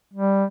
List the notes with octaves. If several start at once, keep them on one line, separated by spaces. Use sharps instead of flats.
G3